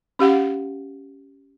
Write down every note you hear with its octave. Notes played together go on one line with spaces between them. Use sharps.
C#4 G4 F5 F#5